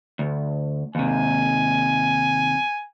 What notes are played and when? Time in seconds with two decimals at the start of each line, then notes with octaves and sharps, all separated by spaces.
0.19 D2
0.95 D#2 C3 G#5